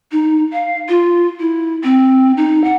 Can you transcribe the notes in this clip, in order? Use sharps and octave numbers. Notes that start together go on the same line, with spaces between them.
D#4
F5
F4
E4
C4
D#4
F#5